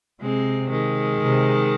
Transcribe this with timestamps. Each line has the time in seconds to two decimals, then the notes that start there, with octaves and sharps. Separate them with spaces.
0.21 C3 G#3 C4
0.71 D#3 G#3
1.20 C3